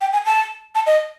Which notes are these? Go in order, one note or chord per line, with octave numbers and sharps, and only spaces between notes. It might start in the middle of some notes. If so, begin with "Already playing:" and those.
G5
G#5
A5
A5
D#5